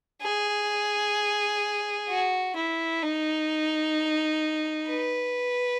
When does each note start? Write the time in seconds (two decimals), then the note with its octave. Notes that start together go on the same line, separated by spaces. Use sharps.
0.22 G#4
2.09 F#4
2.56 E4
3.03 D#4
4.89 B4